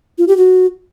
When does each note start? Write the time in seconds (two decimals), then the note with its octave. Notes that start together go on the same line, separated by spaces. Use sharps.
0.18 F4
0.28 G4
0.37 F#4